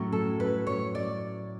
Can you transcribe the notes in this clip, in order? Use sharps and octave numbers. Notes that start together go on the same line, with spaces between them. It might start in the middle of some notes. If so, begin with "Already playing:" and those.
Already playing: A2 F#3 C#4
A4
B4
C#5
D5